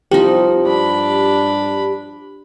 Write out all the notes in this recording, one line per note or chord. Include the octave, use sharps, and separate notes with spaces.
C2 F3 D#4 G4
G2 D4 B5